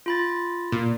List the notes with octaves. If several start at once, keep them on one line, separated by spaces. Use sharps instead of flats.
F4 B5 A6
A#2